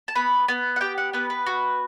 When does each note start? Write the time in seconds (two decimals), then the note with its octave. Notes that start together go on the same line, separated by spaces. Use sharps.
0.08 A5
0.15 B3 B5
0.48 B3
0.76 F#5
0.81 G4 G5
0.98 F#5
1.13 B3 B4
1.30 B4
1.46 F#4